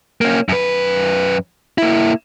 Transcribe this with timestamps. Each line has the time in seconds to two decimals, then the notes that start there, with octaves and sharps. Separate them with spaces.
0.21 A#3 C#4
0.49 F#2 B4
1.78 A#3 E4